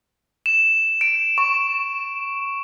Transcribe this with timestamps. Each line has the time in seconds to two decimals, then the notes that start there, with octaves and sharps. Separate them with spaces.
0.46 E7
1.01 D7
1.38 C#6